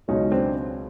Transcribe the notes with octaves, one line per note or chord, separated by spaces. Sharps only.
C#2 B2 F#3 C#4 D#4
C4 D4